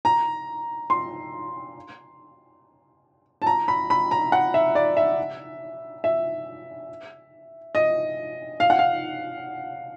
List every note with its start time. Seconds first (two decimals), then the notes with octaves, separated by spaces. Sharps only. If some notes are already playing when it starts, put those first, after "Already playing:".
0.05 A#5
0.90 C6
3.42 A5
3.46 A#5
3.68 B5
3.90 B5
4.11 A#5
4.32 F#5
4.54 E5
4.75 D5
4.97 E5
6.04 E5
7.75 D#5
8.60 F5
8.70 F#5
8.79 F5